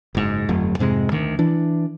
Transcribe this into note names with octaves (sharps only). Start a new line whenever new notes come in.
F#1 G#2
G1 F2 F#3 A3
F2 G#2 C3 G#3
D2 D#3
E3 D4